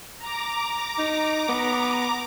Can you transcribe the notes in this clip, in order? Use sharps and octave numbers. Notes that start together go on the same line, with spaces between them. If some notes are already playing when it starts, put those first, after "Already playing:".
A#5 D6
D#4
B3